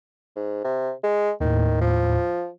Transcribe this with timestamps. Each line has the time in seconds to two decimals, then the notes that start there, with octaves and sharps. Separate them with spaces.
0.36 G#2
0.65 C3
1.04 G#3
1.40 D#2 A2 D#3
1.81 F3